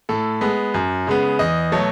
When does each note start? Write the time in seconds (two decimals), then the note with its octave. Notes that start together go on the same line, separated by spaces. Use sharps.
0.09 A2 A4
0.41 G#3 B3
0.74 F#2
1.07 C#3 G#3 B3
1.39 E2 D#5
1.72 B2 F#3 A3